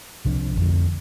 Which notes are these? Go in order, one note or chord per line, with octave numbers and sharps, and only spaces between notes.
C2 C3 F3 D4
F1 F2 D3